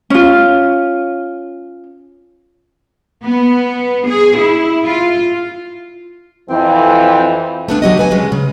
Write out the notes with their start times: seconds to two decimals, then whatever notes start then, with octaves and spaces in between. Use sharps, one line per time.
0.10 C#4 F4
3.25 B3
4.09 G#4
4.40 E4
4.84 F4
6.50 F2 E3 C4
7.68 A3 B3 D4
7.82 D3 F#3 G4 D#5
7.97 D#2 B4 G#5
8.11 C#3 F#3 G#3 C#4
8.32 C#3